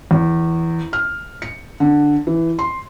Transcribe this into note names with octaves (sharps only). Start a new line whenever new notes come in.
E2
F6
C#7
D3
E3
C6